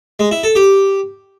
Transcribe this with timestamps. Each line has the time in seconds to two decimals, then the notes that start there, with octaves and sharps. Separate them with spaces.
0.19 G#3
0.31 E4
0.43 A4
0.55 G4